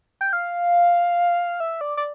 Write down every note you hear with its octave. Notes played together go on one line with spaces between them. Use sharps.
G5
F5
E5
D5
D5